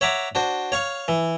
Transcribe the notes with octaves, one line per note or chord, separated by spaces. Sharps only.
C#5 E5 F#5 A#5 D6
D4 F#4 C5
C#5 F5 C#6
E3